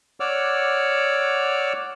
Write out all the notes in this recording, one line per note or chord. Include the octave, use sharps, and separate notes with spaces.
C#5 D5 F#5 D6 E6 F6